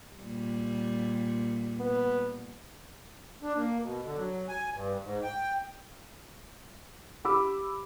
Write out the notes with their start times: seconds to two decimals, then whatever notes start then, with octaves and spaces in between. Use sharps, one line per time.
0.17 A#2 G3
1.80 B3
3.43 D4
3.56 A#3
3.82 B2
4.04 D3
4.17 F#3
4.49 G#5
4.74 G2
5.04 G#2
5.23 G5
7.24 G4 B5 D6 E6